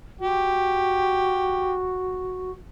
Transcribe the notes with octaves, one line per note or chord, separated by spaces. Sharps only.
F#4 G4